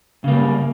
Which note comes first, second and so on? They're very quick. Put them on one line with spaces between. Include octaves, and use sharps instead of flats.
C#3 A#3 G3